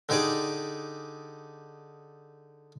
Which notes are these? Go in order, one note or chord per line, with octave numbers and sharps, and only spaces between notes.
D3 D#4 G4 G#4 D5